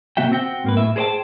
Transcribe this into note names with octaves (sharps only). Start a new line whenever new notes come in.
C3 A#3 F#4 E5 G5
C4 F#4 G5
G#2 A#3 B4
A2 E5
G#4 A#4 C5 D5 G5 A5